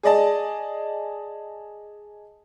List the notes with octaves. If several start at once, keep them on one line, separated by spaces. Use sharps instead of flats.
G#4 D5 D#5 A5